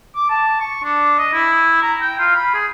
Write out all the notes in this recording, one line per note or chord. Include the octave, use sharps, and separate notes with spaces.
D6
A5
C#6
D4
D#5
E4
A#5
G5
F4
B5
G#4